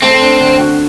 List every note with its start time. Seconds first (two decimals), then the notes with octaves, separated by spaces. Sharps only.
0.02 A3 C4
0.21 D4
0.40 D3
0.59 F#4